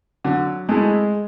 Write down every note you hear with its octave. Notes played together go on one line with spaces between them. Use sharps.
D3 F#3
G#3 A3 E4 G#4